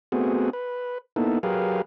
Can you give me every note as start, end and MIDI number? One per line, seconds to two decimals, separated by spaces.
0.12 0.50 57
0.12 0.50 59
0.12 0.50 60
0.12 0.50 66
0.12 0.50 68
0.53 0.98 71
1.16 1.39 58
1.16 1.39 59
1.16 1.39 63
1.16 1.39 64
1.16 1.39 69
1.43 1.82 54
1.43 1.82 67
1.43 1.82 68
1.43 1.82 70
1.43 1.82 71
1.43 1.82 77